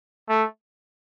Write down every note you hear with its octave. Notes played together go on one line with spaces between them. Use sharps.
A3